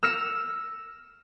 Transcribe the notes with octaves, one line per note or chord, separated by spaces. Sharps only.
E6 F6 A#6 C#7 E7